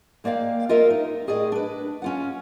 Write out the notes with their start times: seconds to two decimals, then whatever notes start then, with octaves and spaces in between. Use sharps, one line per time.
0.24 G#3 A#3 D5 F5 G5
0.69 F4 A#4 D#5 E5
0.90 D#4
1.27 A2 G#4 D5 D#5
1.52 D4 B4
2.02 C#4 F4 F#5